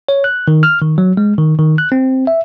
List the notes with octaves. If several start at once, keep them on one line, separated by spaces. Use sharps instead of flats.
C#5
F#6
D#3
F6
D#3
F#3
G#3
D#3
D#3
F#6
C4
E5